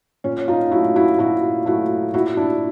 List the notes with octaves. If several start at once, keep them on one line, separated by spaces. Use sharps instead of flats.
A#2 C#4
D#4 F4
F#3 A3 E4 F#4
E4 F#4
A#2 E4 F#4
F#3 A3 E4 F#4
A#2 E4 F#4
D4 E4